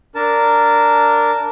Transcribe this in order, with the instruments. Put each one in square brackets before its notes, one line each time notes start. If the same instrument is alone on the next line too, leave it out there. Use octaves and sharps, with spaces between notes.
[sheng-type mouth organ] D4 A#4 A5